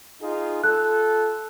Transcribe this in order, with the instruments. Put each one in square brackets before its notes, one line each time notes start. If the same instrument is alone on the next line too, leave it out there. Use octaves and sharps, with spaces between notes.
[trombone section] D#4 F4 G#4
[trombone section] F4 A4 [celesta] F#6